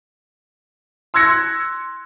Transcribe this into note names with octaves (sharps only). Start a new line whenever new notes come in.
C6 E6 F#6 G#6 A#6 C#7